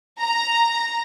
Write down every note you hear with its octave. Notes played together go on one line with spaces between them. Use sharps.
A#5